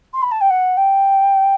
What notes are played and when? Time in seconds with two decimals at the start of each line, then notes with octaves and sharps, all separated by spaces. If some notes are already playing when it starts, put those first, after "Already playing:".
0.13 C6
0.22 B5
0.31 A5
0.41 G5
0.50 F#5
0.77 G5